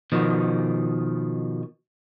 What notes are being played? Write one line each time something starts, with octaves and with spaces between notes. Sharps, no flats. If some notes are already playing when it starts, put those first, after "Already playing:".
B2 D#3 F3